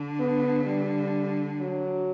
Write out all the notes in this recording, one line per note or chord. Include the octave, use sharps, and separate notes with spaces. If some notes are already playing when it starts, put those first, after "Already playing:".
Already playing: D3
B3
G3
F#3